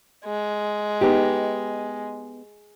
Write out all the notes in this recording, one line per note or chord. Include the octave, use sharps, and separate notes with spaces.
G#3
B3 D#4 G4